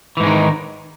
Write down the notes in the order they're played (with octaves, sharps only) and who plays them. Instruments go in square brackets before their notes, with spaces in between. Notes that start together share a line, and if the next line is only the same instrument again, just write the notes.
[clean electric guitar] E3
G#2
G#3
D#3